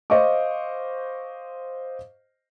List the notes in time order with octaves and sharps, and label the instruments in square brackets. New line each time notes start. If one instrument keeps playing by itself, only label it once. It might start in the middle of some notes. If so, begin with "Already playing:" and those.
[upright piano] C5 D#5 F5 C#6 D6